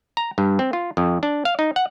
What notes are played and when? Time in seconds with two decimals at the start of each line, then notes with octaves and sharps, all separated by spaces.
0.17 A#5
0.38 G2
0.59 C4
0.73 F4
0.97 F2
1.23 D4
1.45 F5
1.59 D#4
1.76 F#5